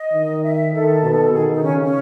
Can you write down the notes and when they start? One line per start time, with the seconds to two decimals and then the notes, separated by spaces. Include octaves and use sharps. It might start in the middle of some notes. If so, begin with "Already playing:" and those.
Already playing: D#5
0.12 D#3
0.43 E5
0.73 D#3 A4
1.02 B2
1.32 D#3 G#4
1.53 D#4
1.62 C#3 C#4
1.83 C#4